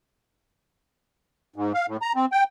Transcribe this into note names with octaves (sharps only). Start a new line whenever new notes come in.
G#2
F5
A2
A#5
C4
G5